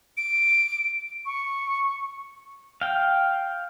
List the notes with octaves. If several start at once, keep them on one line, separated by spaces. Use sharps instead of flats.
D7
C#6
F5 G5